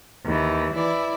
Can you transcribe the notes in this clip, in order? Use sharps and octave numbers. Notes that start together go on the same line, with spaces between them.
D#2 E3
E3 E4 D5